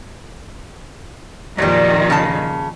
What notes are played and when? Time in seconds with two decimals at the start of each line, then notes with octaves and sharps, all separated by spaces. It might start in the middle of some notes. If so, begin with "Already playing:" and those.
1.58 F2 A#2 D#3 F#3 G3
2.10 C#3 A5